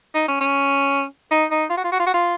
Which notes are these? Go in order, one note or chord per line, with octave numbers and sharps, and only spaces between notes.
D#4
C#4
C#4
D#4
D#4
F4
F#4
F4
F#4
F4
F#4
F4